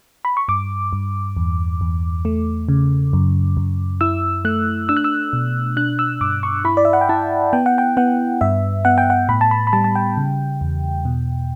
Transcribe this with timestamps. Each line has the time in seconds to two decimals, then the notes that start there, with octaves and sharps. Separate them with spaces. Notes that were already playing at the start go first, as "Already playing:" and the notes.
0.25 B5
0.37 C#6
0.48 G2 D6
0.93 G2
1.37 E2
1.81 E2
2.25 A3
2.69 C#3
3.13 F#2
3.57 F#2
4.01 E4 E6
4.45 A3 F#6
4.89 D4 E6
4.97 F#6
5.04 E6
5.33 B2
5.77 D4 F#6
5.99 E6
6.21 G2 D6
6.43 C#6
6.65 E4 B5
6.77 D5
6.85 E5
6.93 F#5
7.01 G5
7.09 E4 A5
7.53 B3 G5
7.66 F#5
7.78 G5
7.97 B3 F#5
8.41 G2 E5
8.85 B3 F#5
8.98 G5
9.10 F#5
9.29 A2 B5
9.41 A5
9.51 B5
9.67 B5
9.73 G3 A5
9.84 A5
9.95 G5
10.17 C#3
10.61 E2
11.05 B2